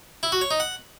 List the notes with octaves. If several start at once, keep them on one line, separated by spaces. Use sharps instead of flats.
E4
F#4
C#5
D#4
F#5